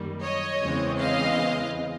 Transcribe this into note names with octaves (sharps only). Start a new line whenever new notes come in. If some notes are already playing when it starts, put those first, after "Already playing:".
Already playing: F#2 D#3 G3 A#3
C#5 D#5
E2 C#3 E3 G#3 C4
D#5 F5